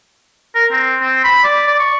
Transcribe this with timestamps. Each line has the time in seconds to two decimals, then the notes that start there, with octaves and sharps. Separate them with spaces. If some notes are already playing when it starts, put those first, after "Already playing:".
0.55 A#4
0.72 C4
1.02 C4
1.24 B5
1.44 D5
1.67 D5
1.79 C#6